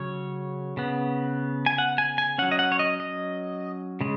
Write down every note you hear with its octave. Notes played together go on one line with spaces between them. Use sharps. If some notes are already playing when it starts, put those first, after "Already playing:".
Already playing: C#3 F#3 C#4 C#5
C#3 B3
G#5
F#5
G#5
G#5
F#3 C#4 F#5
D#5
F#5
C#5
D#5
D#5
C#3 G#3